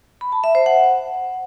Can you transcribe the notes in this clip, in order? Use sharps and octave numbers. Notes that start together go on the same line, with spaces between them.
B5
A5
E5
C5
F#5